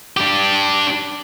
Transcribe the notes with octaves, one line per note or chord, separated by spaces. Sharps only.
D4 G4